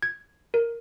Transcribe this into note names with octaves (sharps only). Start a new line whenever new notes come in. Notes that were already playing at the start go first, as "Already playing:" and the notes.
G#6
A#4